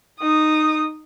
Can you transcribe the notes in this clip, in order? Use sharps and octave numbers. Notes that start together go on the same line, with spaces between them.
D#4 D#6